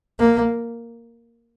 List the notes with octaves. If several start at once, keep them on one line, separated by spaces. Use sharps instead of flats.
A#3